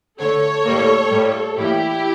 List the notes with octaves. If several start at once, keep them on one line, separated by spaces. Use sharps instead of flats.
D3 A3 A4 C#5
A2 G3 A#3
A2 G3 A#3
A2 E3 G3 A#3 E4 G4